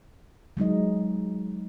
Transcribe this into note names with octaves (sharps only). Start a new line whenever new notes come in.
F#3 G#3 D#4 D#5